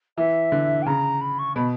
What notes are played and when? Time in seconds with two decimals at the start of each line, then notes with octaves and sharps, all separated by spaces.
0.17 E3 E5
0.52 D3
0.82 G5
0.86 C#3 A#5
1.21 B5
1.39 C#6
1.56 B2 B5